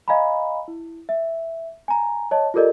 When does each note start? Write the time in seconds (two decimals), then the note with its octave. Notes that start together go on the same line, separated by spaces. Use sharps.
0.08 D#5 F5 G#5 A#5 B5
0.68 E4
1.09 E5
1.88 G#5 A#5
2.31 C#5 D#5 A5
2.54 F4 G4 A4 A#4 D5 D#5